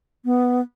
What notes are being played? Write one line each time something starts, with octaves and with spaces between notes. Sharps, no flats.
B3